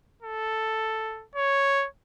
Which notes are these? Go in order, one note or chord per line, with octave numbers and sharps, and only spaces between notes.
A4
C#5